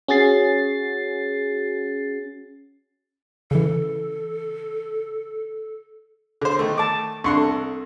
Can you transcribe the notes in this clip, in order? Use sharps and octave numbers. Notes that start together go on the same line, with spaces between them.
C#4 F#4 G#4 A6 C7
C#3 E3 A4
D3 C5
D#3 A3
A5 D6
C2 D4 C6 C#6 F#6
A4